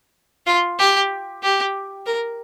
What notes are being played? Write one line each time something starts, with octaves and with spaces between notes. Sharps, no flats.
F4
G4
G4
A#4